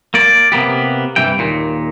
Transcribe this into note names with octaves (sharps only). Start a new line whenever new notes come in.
A#3 D5
C3 A#3 B3 G4
C2 G2 E3 G5
D#2 A#2